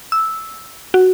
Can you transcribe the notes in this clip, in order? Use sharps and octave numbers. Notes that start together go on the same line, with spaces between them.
E6
F#4